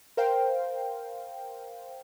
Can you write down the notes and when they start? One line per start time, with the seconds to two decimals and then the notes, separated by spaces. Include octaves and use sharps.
0.17 A#4 C5 F5 G5